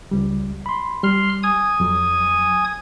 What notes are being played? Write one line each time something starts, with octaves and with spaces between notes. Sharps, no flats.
C#2 G3
B5 C6
G3 C6 F6
G#5 D#6 G#6
F2 F#3